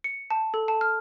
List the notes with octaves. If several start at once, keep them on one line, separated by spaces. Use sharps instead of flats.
C#7
A5
A4
A5
F6